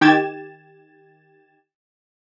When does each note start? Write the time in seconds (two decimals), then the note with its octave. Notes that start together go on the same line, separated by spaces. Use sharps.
0.01 D#3 G4 G5 G#6 A6 E7